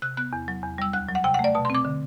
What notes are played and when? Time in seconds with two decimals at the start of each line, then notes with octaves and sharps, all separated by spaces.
0.02 C3 F#6
0.17 B3 F#6
0.33 E2
0.48 F#3
0.63 E2
0.78 G3 E6
0.93 D2 F#6
1.08 F#3
1.15 F#5
1.24 C3 G5
1.34 F#5
1.39 A3
1.44 D5
1.55 B2 A5
1.65 C6
1.70 C4 D6
1.85 D3